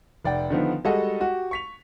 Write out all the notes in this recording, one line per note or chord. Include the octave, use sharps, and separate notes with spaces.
F1 D5 F#5 G5
D3 D#3 F3 B3
G3 G#3 F#4 A4 D#5
F#4 G4
C#6 B6 F7